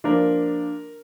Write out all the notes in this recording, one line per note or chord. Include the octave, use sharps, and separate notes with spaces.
F3 A#3 D4 A#4